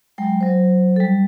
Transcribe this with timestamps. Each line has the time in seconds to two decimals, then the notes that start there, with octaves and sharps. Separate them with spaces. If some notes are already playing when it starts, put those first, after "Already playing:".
0.18 F#3 G#3 G5
0.41 F#3 C5
0.96 G3 A4